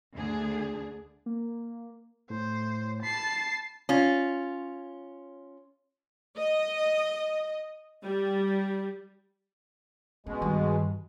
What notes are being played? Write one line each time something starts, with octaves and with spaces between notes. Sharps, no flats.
D2 D3 D4 G#4
A#3
A2 C5
A5 B5 C7
C#4 F4
D#5
G3
B2 G#3 C#4
G2 D#3